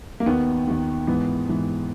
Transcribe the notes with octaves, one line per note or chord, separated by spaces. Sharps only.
A#3
D#2 D#3 B3
D#2 D#3
G#2 E3 B3
G#2 E3